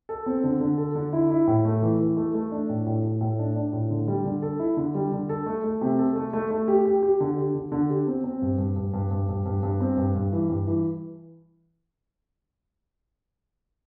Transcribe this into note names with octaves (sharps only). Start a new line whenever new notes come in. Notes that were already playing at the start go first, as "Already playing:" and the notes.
A4
C4
D3
D3
A4
D3
E4
E4
A2
A3
E3
E3
A3
A3
D4
A2
A2
A2
A2
D4
D4
A2
D3
G3
D3
A4
E4
D3
G3
D3
A4
A3
A3
C3
A4
A3
A3
A3
G4
G4
G4
D3
G4
D3
D3
G4
C4
C4
G2
G2
G2
G2
G2
G2
G2
G2
C4
G2
G2
E3
G2
E3